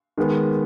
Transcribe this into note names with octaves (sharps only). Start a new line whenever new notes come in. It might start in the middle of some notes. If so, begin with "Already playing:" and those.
D#3 G#3 B3